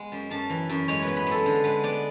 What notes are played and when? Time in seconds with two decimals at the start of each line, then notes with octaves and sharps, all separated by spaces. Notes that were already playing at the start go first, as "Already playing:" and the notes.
Already playing: G#3 B3
0.12 F#2
0.31 F#2 A5
0.50 E3
0.69 F#2
0.88 G#3 C#5
1.02 B3 B4
1.16 B4
1.27 G#3 A4
1.46 D3
1.64 G#3 B4
1.83 B3 D5